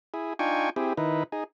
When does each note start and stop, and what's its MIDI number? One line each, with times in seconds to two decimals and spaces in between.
0.14 0.33 64
0.14 0.33 68
0.39 0.70 62
0.39 0.70 63
0.39 0.70 65
0.39 0.70 79
0.39 0.70 80
0.39 0.70 85
0.76 0.93 60
0.76 0.93 64
0.76 0.93 67
0.76 0.93 68
0.97 1.23 51
0.97 1.23 63
0.97 1.23 64
0.97 1.23 71
1.32 1.44 63
1.32 1.44 68